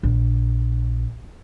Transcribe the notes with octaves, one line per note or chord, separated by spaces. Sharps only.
A#1